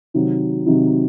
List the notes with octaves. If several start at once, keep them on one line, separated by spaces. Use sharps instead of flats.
C3 D#3 F#3 C4 D#4
C3 D#3 F#3 C4 D#4